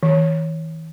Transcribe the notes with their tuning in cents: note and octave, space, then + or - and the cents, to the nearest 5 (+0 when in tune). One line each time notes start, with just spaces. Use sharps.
E3 -45